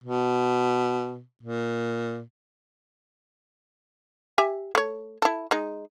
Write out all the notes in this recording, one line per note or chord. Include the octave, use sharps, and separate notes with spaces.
B2
A#2
G4 E5 G#5
A3 C#5
E4 A4
G#3 D#4